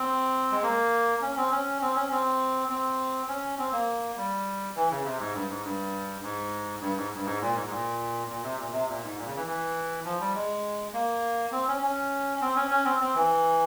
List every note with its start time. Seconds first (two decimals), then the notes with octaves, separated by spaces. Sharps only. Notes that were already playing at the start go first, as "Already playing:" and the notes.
Already playing: C4
0.51 G#3
0.63 A#3
1.22 C#4
1.37 C4
1.51 C#4
1.82 C4
1.95 C#4
2.11 C4
2.69 C4
3.28 C#4
3.58 C4
3.72 A#3
4.17 G3
4.76 E3
4.91 C#3
5.04 C3
5.19 G#2
5.34 G2
5.49 G#2
5.64 G2
6.23 G#2
6.81 G2
6.96 G#2
7.15 G2
7.25 G#2
7.41 A#2
7.55 G#2
7.66 G#2
7.70 A#2
8.29 A#2
8.43 C3
8.59 A#2
8.72 C3
8.88 A#2
9.03 G#2
9.18 A#2
9.26 C#3
9.37 E3
9.47 E3
10.05 F3
10.20 G3
10.35 G#3
10.93 A#3
11.52 C4
11.68 C#4
11.82 C#4
12.41 C4
12.56 C#4
12.71 C#4
12.85 C4
13.00 C4
13.15 E3